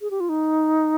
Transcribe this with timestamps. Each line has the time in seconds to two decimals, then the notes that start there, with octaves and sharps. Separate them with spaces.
0.01 G#4
0.11 G4
0.20 F4
0.29 D#4